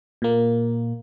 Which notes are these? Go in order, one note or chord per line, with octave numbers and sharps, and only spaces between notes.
A#2 A#3